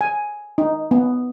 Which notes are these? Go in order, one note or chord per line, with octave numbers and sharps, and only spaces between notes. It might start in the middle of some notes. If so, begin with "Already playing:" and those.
G#5
D#4
B3